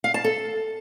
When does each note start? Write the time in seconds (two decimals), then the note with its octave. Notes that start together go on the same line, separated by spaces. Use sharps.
0.04 F5
0.14 A5
0.24 A4